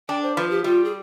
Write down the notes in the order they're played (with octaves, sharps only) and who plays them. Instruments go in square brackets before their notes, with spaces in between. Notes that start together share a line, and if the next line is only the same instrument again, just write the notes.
[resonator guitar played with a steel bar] D4 [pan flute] G5
[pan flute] C5
[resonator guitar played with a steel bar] F3 [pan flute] B4
[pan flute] G4
[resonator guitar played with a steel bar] G3 [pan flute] F4
[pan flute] G#4